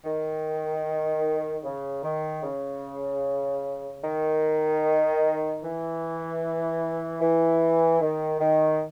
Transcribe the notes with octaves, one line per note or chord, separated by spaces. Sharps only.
D#3
C#3
D#3
C#3
D#3
E3
E3
D#3
D#3